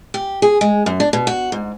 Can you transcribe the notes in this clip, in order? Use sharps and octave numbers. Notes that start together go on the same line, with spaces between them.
G4
G#4
G#3
F#2
D4
B2
F#4
G#2